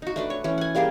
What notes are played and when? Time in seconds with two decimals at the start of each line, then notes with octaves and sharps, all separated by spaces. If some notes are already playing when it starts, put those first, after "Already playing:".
0.02 D#4 F#4
0.16 A3 D4 B4
0.30 C#5
0.44 E3 C#4
0.58 F#5 G#5
0.75 G3 A#3 G4 G#4